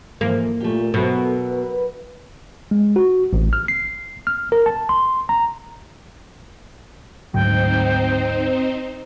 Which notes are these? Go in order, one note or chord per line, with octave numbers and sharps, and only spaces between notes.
G#2 E3 F3 A#3
A#2 A3 G4
B2 F#3 B3 A4 A#4 E5
B4
G#3
F#4
A1
F6
C7
F6
A#4
A5
C6
A#5
D2 G#2 F#3 C4 D#4 C5 G5